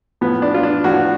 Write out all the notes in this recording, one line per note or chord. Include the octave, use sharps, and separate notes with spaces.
A2 F3 B3
D4
F4
D4
A2 F3 F#4